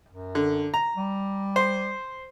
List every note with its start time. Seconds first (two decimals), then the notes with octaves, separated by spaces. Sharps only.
0.09 F#2
0.35 D3
0.74 A#5
0.96 G3
1.56 C5